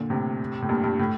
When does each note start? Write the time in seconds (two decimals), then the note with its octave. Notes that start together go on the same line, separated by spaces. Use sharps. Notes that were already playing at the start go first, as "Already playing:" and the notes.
Already playing: A#2 D3
0.10 A2 C3
0.62 A2
0.69 G2 A#2
0.84 G2
0.99 A2